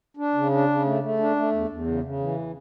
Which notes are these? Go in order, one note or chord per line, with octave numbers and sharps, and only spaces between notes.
D4
C#3
D4
C#3
A3
A3
D4
A3
E2
E2
C#3
C#3
E3